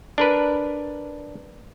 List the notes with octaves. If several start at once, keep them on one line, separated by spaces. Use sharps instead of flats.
D4 A#4 B4